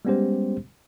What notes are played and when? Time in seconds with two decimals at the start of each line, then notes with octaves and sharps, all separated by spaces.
0.05 G3 G#3 B3 C#4 G4 C5